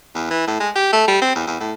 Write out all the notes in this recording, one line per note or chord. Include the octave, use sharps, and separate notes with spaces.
E2
E3
A2
G#3
G4
A3
G3
C4
E2
E2
A2